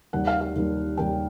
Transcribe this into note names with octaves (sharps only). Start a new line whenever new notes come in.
D#2 D#3 G3 A#3 F#5
F5
F5
D#2 D#3 G3 A#3
D#2 D#3 G3 A#3 G5